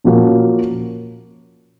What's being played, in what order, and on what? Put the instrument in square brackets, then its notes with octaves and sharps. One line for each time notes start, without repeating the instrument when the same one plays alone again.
[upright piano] A#2 F3 A#3 C#4 F#4